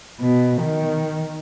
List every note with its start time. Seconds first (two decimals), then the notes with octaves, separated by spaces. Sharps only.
0.20 B2
0.63 D#3